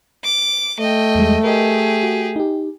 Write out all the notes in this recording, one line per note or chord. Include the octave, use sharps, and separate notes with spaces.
D6
A3 D#5 G5
E2 G3 G#3
G4 G#4 A#4 D#5
F#4
D#4 G4